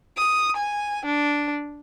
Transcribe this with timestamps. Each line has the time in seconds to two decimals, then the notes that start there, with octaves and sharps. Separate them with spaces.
0.17 D#6
0.56 G#5
1.06 D4